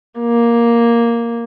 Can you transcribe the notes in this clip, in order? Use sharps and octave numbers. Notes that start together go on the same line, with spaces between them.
A#3